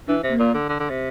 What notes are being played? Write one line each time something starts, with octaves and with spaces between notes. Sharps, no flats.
E3 D4
C3
A#3
A#2
D3
D3
D3
C3